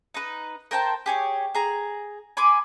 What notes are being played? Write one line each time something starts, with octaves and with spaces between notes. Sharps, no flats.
D#4 B4
A#4 C5 G5 A5
G4 G#4 C#5
G#4 A#5
G#5 B5 C6 D6